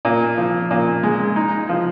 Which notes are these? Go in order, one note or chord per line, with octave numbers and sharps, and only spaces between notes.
A#2
F3
A#2
G#3
D#4
F3